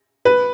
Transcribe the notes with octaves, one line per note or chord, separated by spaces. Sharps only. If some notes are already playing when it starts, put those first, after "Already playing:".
B4